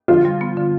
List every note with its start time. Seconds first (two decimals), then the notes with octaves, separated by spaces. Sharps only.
0.08 D3 F3 F4
0.25 G3
0.41 B3
0.57 D3